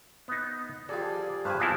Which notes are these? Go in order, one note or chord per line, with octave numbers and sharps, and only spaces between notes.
B3 D#4
F3 G3 G#4 A4 D5
G2 G4 C5 D5 F5 G#5 B5 F#6
B3 C4 E4 F4 G#5 A5